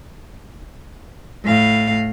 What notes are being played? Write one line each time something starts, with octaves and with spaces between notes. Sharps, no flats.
A2 F5